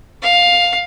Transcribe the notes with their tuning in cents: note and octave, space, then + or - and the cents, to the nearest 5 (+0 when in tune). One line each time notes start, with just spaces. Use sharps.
F5 +10